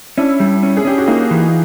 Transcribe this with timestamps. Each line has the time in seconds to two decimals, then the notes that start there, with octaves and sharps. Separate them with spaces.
0.18 C#4 D4 E4
0.40 G3
0.63 C#4
0.77 G#4
0.85 C#4 G4
0.98 F#4
1.07 A#3 D#4 F4
1.31 E3